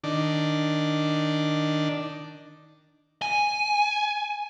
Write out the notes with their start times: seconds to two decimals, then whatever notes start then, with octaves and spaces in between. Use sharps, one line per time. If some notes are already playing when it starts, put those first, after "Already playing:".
0.04 D#3 D4
3.22 G#5